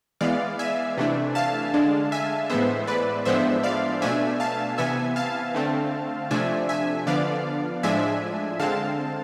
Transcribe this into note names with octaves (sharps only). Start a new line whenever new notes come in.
E3 G#3 B3 D5 F5
E5 G#5
C3 E3 A3 D4
F5 A5
D3 G#3 D4
E5 G#5
A2 E3 G#3 B3 C5 E5
B4 D5
A2 F3 G#3 B3 D4 C5 E5
D5 F5
B2 A3 D4 E5 G#5
F5 A5
C3 E3 B3 E5 G#5
F5 A5
D3 A3 C4
C3 F3 A3 D4 E5 G#5
E5 G#5
D3 F3 B3 D4 D5 F5
A2 F3 G#3 D4 E5 G#5
D3 G#3 C4 F5 A5